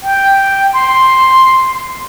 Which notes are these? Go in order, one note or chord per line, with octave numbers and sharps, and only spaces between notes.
G5
C6